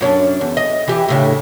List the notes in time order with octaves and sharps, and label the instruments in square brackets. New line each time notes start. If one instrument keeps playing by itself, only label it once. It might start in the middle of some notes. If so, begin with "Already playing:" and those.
[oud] F#2 C#4 D4
E2
D#5
E3 G4
A2 C#3 D4